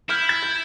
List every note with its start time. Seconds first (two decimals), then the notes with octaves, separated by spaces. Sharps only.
0.09 E4 F6 G6
0.29 G#6
0.43 G6